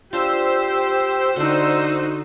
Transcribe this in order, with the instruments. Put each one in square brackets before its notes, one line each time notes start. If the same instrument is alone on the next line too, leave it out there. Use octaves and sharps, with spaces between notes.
[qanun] D4 F4 [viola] G4 [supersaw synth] C5 E6
[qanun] D3 D4 [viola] D#4 F#4